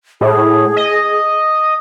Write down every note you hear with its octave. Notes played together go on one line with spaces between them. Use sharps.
A2 G#4
D#5